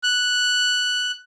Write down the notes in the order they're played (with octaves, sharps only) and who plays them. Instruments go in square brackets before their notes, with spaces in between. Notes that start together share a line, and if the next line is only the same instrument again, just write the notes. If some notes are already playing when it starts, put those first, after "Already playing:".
[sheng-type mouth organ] F#6